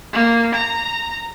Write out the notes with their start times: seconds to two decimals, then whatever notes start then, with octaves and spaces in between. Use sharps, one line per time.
0.13 A#3
0.55 A#5